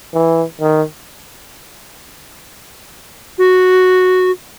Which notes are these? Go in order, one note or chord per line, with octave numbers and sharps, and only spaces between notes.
E3
D#3
F#4